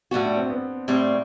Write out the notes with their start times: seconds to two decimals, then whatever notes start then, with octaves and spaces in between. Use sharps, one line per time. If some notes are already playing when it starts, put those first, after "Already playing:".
0.11 A2 G3 B3 F#4
0.25 D4
0.37 C4
0.50 B3
0.88 A2 G3 C4